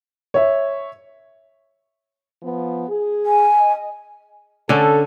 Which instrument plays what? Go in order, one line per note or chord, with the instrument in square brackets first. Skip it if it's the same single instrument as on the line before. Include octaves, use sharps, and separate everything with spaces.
[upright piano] C#5 E5
[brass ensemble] F3 B3
G#4
[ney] G#5
[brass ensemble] D#5
[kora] D3 C#4 [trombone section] A4